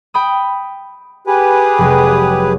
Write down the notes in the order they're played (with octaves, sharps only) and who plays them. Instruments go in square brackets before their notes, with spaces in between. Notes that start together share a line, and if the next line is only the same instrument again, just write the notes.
[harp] G5 B5 D#6
[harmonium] G4 G#4 B4
[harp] F1 F#3 G#3